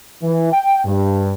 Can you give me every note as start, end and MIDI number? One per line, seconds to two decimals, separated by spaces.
0.23 0.50 52
0.53 0.81 79
0.85 1.33 43